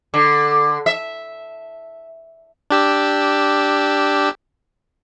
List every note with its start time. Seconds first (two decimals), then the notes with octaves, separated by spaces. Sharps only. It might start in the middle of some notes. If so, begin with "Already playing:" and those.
0.14 D3
0.86 E5
2.70 D4 G4 E6